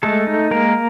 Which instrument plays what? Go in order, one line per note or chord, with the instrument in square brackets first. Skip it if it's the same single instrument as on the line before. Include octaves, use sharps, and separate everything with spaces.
[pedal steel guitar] G#3 A3 A4
D#4
G#3 A#3 A#4